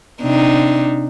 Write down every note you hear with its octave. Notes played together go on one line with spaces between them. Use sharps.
C3 D4 D#4